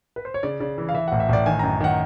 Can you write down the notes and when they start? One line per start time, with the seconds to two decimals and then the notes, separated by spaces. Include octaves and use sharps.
0.16 B4
0.25 C5
0.34 C#5
0.43 C#3 D5
0.60 C#3 D5
0.78 E3
0.89 F5
0.94 E3 E5
1.08 A1 F#5
1.20 E5
1.29 A1 D5
1.46 D#3 G#5
1.59 F#2 A#5
1.81 D#3 F#5